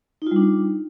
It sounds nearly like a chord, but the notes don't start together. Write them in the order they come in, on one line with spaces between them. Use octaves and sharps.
D#4 F4 G3 D4